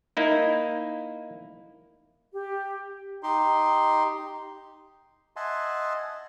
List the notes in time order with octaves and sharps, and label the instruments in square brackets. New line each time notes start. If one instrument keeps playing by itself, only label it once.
[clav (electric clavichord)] A#3 D#4 E4
[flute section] G4
[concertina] D#4 G4 C6
D#5 E5 F#5 G#5 A5 C6